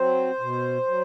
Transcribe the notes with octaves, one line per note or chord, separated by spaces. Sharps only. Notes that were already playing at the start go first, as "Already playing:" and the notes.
Already playing: F#3 C4 C5
B2
F#3